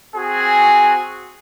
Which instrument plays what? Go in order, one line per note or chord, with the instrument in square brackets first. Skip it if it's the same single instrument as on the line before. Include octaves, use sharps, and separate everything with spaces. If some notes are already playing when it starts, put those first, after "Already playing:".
[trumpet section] C4 F#4 G#4 G#5